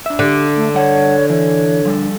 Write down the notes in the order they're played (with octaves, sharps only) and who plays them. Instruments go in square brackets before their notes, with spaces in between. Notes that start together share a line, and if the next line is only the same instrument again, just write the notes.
[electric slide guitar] D4 E5
[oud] D3 [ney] G4
[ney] A3
[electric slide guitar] G2 F#5 A5 [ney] C#5
[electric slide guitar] E3 [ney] C#5
[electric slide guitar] F3 G3 A4